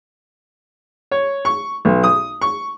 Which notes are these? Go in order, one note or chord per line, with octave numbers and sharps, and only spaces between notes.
C#5
C#6
B1
D#6
C#6